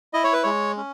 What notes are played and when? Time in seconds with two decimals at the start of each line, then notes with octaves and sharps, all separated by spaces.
0.13 E4 D#5
0.24 C#5
0.33 B4
0.43 G#3 C#5
0.77 C#4